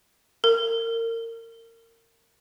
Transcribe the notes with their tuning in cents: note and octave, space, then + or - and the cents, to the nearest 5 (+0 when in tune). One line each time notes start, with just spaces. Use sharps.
A#4 -30